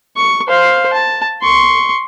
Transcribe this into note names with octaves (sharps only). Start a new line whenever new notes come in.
C#6
C5 F5
A5
C6 C#6